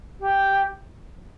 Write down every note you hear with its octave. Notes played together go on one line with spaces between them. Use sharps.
G4